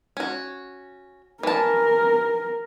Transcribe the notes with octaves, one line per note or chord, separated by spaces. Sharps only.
C#4 F#4
E3 A#4 A5